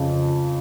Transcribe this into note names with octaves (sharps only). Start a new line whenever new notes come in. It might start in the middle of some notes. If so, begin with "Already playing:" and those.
Already playing: F2 C#3